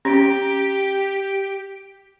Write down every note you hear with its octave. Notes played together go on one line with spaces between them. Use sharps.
C#4 G4